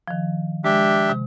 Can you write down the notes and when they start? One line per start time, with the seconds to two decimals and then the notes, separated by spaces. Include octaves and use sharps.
0.08 D#3 F3
0.64 G#3 D4 G4 E5
1.10 C3